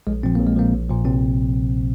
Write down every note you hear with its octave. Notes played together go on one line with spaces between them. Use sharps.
A#1 G#3
A#2 F3 C4
A#1 A#3
G#3
A#2 F3 A#3
A#1
A#2 F3
A#1 C3 C4